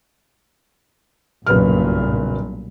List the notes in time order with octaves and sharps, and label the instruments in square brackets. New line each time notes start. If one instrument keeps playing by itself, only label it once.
[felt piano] F#1 B4 F6 [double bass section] B1 G2 A#2